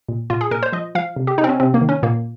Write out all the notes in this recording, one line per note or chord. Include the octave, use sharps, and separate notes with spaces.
A#2
A#2 F4
G#4
A#2 A#4
C5
F3 D#5
F3 F5
C3
G4
C3 D#4
C4
C#4
C3 C4
A#3
D#3
C#4
A#2 A#3